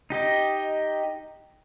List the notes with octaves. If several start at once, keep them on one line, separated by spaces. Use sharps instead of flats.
D#4 G4 D#5